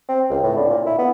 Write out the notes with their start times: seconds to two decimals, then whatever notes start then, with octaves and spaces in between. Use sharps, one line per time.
0.09 C4
0.30 C#2
0.43 A2
0.57 D3
0.70 A#2
0.86 E4
0.98 B3